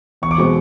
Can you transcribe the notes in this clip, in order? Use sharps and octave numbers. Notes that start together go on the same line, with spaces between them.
E2 C#6
D6
B2 G#3 C4 C#6